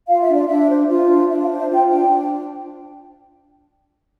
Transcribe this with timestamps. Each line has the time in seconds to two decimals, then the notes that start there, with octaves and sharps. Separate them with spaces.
0.08 F4 F5
0.22 E5
0.29 D4
0.34 D5
0.47 D4 E5
0.69 C5
0.89 F4
1.09 D4
1.29 D4 E5
1.44 F5
1.49 C5
1.59 E5
1.69 F4 G5
1.89 D4 G5
2.09 D4